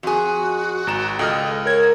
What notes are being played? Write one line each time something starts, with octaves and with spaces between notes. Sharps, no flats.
F2 F#4 G#4
G#1 A#5 E7
C#2 A4 D#5 G5 F6
A#4 C#5 G#6